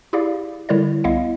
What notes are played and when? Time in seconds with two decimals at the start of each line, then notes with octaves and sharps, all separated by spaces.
0.13 E4 G4 G#4 D5 F5
0.69 D3 G3 E4 A#4 C#5 D5
1.04 C2 B3 E4 D#5 F5